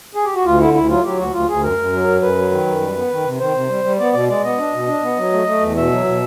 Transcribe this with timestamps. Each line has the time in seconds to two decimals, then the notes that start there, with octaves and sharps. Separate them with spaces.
0.15 G#4
0.25 G4
0.35 F#4
0.45 D2 F4
0.60 D3 E4
0.74 D2 E4
0.89 F#3 F4
1.04 F#3 G4
1.18 D2 F#4
1.33 D2 F4
1.48 D2 G#4
1.63 F#2 A#4
1.78 F#2
1.92 F#3
2.08 F#2
2.21 F#2 B4
2.37 F#3
2.51 D#3
2.66 F#2
2.81 G3
2.96 B3
3.11 D#3
3.25 C3
3.40 D#3 C5
3.54 C3
3.69 G3
3.84 G3
3.99 B3 D5
4.13 B2 D5
4.29 G#3 D5
4.43 B3 D#5
4.58 D4
4.73 B2
4.88 D4
5.03 B3
5.17 F#3
5.32 A3
5.46 A3
5.61 E2
5.76 B2 E5
5.91 F#3
6.05 B2